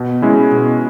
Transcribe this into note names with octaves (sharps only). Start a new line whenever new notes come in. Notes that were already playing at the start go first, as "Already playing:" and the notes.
Already playing: B2
G#3 C#4 E4
B2